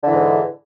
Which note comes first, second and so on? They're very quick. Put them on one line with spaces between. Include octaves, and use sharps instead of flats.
D3 E3 G#2